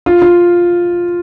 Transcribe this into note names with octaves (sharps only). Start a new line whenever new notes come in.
F4
F4